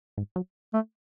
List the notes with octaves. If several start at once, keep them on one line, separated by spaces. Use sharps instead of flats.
G#2
F#3
A3